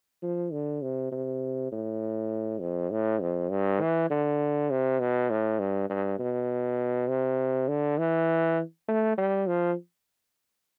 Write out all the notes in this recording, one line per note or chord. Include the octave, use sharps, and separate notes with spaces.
F3
D3
C3
C3
A2
F2
A2
F2
G2
E3
D3
C3
B2
A2
G2
G2
B2
C3
D3
E3
A3
G3
F3